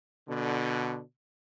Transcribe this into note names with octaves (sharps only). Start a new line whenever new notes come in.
B2 D3